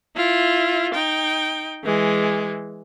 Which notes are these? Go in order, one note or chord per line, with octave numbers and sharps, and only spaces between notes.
E4 F4
D#4 G5
E3 G#3